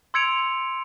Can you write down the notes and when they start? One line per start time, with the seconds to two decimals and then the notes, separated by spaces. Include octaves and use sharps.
0.14 C6 E6 G#6 C#7 D7 F7